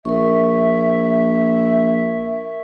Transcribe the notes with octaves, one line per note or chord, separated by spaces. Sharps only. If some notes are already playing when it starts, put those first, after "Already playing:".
A#1 A#4 E5 C#6